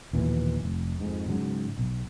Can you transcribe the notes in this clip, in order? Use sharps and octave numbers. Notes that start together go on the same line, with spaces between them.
A#1 D#2 B2 E3
F1
F2 G#2
G#2 C#3 F#3
B1